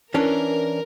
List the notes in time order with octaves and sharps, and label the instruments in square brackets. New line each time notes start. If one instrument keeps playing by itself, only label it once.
[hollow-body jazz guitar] E3 C#4 D4 [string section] A#4